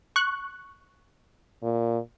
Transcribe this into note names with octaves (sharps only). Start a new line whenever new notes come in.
C#6 F#6
A#2